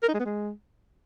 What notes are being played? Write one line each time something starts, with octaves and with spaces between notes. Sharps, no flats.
A#4
D#4
G#3
B3
G#3